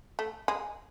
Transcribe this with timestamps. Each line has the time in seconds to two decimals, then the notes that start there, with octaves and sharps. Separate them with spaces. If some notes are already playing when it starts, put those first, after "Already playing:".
0.19 A3
0.48 G#3